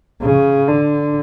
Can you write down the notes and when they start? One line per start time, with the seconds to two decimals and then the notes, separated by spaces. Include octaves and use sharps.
0.22 C#3
0.68 D3